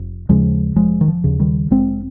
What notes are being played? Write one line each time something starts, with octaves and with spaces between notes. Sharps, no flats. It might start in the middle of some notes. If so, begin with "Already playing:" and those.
Already playing: F1
D#2 C#3 F3 G#3
F1 F3 G#3
D#3
F3
D#2 C#3
D#3 G3
F1 G#3 C4